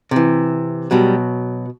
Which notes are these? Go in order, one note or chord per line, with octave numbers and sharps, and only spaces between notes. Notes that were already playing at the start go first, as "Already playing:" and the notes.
C3 E3
B2 F#3 G3